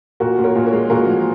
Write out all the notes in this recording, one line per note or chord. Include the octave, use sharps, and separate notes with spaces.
A#2 F#4 A#4
A#2
A#4 C#5
A#2
A#4 C#5
G#3
A#2 F#4 A#4
F3